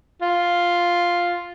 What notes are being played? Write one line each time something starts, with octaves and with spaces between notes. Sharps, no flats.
F4